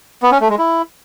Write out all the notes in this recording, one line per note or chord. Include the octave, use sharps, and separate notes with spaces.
B3
C#4
A3
G#3
E4